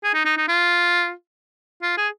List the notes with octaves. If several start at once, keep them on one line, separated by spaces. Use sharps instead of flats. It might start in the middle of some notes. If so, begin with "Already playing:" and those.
G#4
D#4
D#4
D#4
F4
F4
G#4